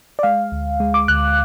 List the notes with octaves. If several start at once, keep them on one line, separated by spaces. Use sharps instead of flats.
D5
G#3 F5
D2
G#3
D6
D2 F#6